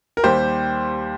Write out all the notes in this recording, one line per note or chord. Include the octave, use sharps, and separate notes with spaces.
A#4
D#2 D#3 G3 G4 C5